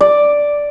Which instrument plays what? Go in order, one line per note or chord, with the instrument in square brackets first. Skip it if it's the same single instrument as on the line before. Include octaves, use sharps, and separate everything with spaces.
[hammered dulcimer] D5